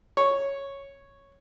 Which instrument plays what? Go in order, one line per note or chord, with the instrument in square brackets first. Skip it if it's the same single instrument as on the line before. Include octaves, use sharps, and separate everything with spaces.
[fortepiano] C#5